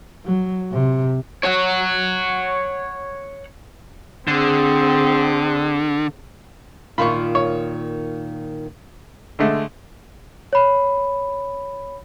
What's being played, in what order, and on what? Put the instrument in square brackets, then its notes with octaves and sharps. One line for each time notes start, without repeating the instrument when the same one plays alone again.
[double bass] F#3
C3
[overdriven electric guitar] C#5 F#5
[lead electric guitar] D3 [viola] C4 G#4
[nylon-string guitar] A#2 D#3 F4 [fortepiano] B5 C#6
[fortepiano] C#5
D3 G#3 A3
[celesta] C#5 B5